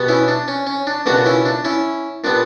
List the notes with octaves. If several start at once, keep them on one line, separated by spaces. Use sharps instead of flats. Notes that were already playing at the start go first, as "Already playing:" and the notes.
Already playing: B2 G3 B3
C#4 E4
D4
C#4
C#4
D4
C#2 B2 G3 A#3 D4 F#4
C#4 E4
D4
C#4 E4
A#2 G3 B3 D4